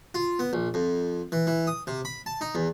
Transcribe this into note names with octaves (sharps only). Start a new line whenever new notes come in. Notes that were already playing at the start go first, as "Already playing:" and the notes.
F4
B3
A#1
F2
E3
E3
D#6
C3
B5
A5
D#4
E2